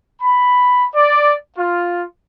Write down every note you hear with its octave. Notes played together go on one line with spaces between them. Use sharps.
B5
D5
F4